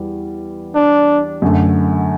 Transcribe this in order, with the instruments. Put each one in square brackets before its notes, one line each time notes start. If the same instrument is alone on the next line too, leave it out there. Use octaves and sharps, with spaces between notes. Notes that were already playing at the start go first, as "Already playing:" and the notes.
Already playing: [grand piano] E2 G3
[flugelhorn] D4
[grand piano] F#2 D3 A3